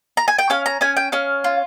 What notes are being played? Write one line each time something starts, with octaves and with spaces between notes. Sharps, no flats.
A#5
G#5
G5
C#4 F5
A#5
C#4 G#5
G5
C#4 F5
F4